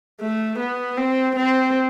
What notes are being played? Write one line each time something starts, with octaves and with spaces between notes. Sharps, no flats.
A3
B3
C4
C4